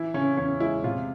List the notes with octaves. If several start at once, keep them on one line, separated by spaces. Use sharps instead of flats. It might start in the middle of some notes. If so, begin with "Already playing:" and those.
Already playing: E3 E4
C#3 C#4
E2 C#4
G#3 E4
C3 F4